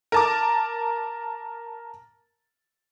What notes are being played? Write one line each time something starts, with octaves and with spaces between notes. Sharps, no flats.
A#4 A5 D6